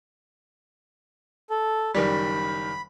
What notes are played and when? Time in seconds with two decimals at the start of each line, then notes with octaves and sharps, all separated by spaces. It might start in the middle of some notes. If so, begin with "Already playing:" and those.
1.50 A4
1.95 F#1 D#3 G3 B5